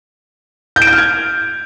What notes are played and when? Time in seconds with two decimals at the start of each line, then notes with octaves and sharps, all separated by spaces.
0.76 G6
0.82 D7
0.87 G6
0.93 F6
0.98 G#6